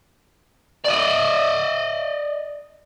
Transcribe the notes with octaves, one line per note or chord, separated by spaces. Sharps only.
D5 D#5